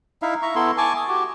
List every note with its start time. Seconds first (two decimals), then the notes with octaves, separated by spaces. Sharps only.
0.22 D#4 E4 E5 F5
0.42 E5 A#5 C#6
0.55 B3 E4 A4 C6
0.78 G#5 A5 C#6 D6
0.97 D#6
1.08 F#4 G4